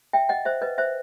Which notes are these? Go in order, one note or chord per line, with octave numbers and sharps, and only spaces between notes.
E5 G5
D#5 F#5
C5 E5
B4 D#5
C5 E5